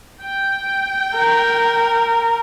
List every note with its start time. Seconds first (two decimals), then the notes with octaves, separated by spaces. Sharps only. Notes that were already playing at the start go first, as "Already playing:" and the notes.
0.22 G5
1.15 A#4